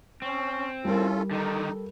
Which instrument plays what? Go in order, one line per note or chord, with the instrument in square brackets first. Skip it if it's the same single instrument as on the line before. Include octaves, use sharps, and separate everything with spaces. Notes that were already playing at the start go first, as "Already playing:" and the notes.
[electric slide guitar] C4 [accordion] C#4 [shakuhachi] C#6
[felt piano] G3 A#4 [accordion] C#4 F4 A4 [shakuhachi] E4
[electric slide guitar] D3 D#3 [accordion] D#4 [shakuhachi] A4